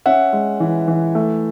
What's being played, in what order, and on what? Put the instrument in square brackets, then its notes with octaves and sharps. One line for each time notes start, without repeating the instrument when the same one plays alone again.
[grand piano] C#4 E5 F#5
G#3
E3
E3
A3